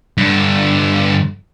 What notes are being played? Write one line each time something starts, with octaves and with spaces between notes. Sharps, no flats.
G2 D3